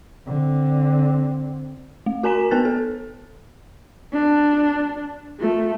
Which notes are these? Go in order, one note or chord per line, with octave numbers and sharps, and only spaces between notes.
D3 C4
A3
F#4 A#4 G#5 A#5 B6 E7
B3 B4 A5 F#6 A6
A4
D4
A3 F4